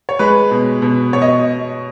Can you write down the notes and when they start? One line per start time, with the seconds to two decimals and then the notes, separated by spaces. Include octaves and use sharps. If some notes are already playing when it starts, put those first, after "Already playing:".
0.09 C#5
0.19 G#3 B4
0.51 B2
0.82 B2
1.13 B2 C#5
1.22 D#5